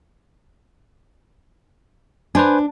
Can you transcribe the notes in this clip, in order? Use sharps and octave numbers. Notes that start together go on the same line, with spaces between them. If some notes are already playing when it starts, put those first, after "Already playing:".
D4 B4 C5 G#5